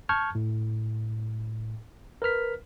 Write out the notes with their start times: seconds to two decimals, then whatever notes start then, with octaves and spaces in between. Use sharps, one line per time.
0.09 A5 C#6 F6 G6 G#6
0.35 A2
2.22 A#4 B4 F6 B6